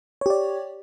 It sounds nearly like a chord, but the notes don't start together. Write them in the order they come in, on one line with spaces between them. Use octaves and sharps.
C#5 G4 D5